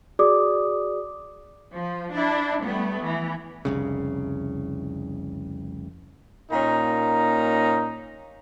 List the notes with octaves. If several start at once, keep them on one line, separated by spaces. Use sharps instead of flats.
F#4 G#4 D5 D6 D#6
F3
D4 E4
G3 A3 B3
E3
F1 C2 C#3
A#2 A#3 C#4 D#4 A#5